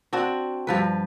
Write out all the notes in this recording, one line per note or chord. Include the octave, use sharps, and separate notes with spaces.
C4 D4 F#4
G2 F3 B4